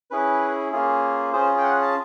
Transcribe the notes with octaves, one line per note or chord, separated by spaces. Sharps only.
C#4 E4 G#4 B4
A#3 C#4 F4 G#4
C#4 F4 G#4 C5
G5
F#5
A5